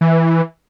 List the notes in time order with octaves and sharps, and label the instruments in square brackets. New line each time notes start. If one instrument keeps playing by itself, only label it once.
[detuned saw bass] E3